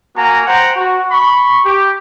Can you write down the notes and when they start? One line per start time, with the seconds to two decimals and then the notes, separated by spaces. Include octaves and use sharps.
0.17 A#3 F#4 G#5 A#5
0.47 C5 F#5 G5 A#5
0.76 F#4
1.11 B5 C#6
1.66 G4